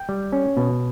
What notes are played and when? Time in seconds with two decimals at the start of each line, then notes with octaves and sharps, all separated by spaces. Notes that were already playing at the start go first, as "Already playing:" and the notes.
Already playing: G5
0.09 G3
0.32 C#4
0.57 B2